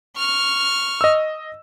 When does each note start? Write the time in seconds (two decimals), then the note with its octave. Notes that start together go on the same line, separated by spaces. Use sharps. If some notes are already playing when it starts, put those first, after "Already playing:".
0.17 C#6 F6
1.01 D#5 E6